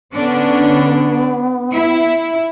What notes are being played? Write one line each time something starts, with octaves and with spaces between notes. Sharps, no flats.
D3 B3 C#4 D4
E4